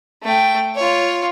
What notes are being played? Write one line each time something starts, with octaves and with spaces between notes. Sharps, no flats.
A3 G5
F4 C#5